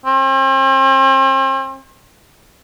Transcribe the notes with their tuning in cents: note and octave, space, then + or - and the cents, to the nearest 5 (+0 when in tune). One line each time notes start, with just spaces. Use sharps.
C4 +40